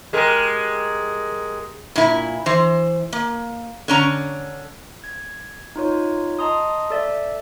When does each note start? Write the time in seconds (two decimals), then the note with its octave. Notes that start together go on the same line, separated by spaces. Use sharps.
0.13 G#3 G4 A#4
1.96 A#2 E4
2.46 E3 C5
3.13 A#3
3.88 D3 C#4 A#5
5.04 G#6
5.76 D#4 F4 C#5
6.39 D#5 A5 A#5 C6 D#6
6.90 A4 D5 E5